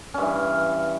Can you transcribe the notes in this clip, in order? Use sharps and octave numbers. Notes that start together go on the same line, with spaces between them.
G2 E3 C#4